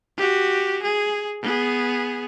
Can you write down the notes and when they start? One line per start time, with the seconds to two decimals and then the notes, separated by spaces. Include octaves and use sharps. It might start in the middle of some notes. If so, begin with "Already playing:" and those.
0.17 F#4 G4
0.82 G#4
1.42 B3 G#4